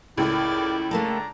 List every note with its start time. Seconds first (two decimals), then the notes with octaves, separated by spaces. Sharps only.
0.18 C#2 A2 E4 A#4 D5 G5
0.91 A3 A#3 D4 A4 A5 A#5